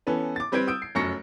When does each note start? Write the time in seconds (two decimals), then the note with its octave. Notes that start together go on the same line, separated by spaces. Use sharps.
0.07 E3 B3 C#4 A4 B4
0.36 D6 A6
0.52 G3 C4 B4 G6 G#6 D7
0.68 D#6 E6 G6 D7
0.82 C7
0.95 F1 F#2 C#6 A#6 C#7